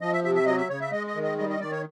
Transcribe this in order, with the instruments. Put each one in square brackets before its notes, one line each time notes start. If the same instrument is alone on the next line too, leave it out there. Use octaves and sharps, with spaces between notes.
[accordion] F3 D#5
E5
C3 E5
E5
F#3 D#5
E5
C#3 C#5
E5
G#3 D#5
D#5
D#3
D#5
G3 D#5
D#5
D#3 D5
C#5